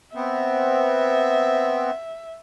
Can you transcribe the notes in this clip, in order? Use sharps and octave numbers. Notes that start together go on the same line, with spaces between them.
B3 C4 E5